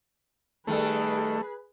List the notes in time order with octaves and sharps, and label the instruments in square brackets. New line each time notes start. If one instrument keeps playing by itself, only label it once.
[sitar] D#3 G3 A4 [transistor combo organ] A3 [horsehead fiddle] G#4 B4